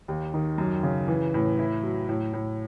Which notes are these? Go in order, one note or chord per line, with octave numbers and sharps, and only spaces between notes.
D#2
D#3
F#2
C#3
E3
A2
E4
F#3
A2
A2